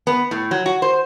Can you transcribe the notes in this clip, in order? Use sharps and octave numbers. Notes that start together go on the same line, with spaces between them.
B3
A2
F#3
F#4
C5